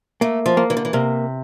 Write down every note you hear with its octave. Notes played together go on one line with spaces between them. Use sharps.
A3 A#3
F3
A#3
E3
D3
E3
C3 A#3